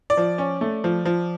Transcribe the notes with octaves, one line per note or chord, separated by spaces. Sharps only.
D5
F3
C#4
A3
F3
F3